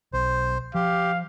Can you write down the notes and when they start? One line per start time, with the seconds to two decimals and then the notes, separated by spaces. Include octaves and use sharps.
0.13 B1 C5
0.75 F3 G4 F5